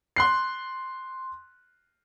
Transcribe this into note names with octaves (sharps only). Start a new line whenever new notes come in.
C6 F#6 C7